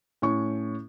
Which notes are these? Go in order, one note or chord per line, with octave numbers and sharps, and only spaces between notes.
A2 C#4 C#6